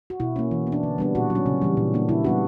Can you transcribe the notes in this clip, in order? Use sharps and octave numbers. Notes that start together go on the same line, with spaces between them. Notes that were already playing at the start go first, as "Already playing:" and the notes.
F#4
B2 E4
A#3 C#4
E3
B3
D4
D3
G3 B3 D4
A#2 F#4
F#3
C#4
C#3
E3 G3
A#2
A#3 D4
C#3 E4
G3 B3 D4 F#4